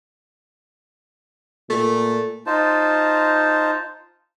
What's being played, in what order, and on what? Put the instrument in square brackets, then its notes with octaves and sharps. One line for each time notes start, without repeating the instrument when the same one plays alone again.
[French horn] A#2 [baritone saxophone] A3
[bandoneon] D#4 F4 C5 A5